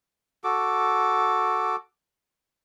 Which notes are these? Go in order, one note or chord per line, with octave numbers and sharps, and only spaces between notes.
F#4 A4 D6